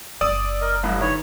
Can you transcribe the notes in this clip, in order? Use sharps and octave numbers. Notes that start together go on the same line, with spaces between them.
F#1 G#3 D5 D#6 E6
A#4 D#5
A1 G2 E4
D#3 B4 C#5